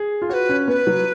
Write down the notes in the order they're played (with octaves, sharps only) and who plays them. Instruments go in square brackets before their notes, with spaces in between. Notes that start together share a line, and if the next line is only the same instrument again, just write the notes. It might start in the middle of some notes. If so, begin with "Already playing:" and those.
Already playing: [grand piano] G#4
F4
[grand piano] F#4 [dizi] B4 C#5
[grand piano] C#4
[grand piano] B3 [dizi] B4
[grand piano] F#3